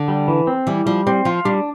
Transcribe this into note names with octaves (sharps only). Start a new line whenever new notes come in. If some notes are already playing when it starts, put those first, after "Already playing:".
Already playing: D3
G3
E3
C4
E3 G3
F3 G3
G3 C4
F3 F4
G3 D4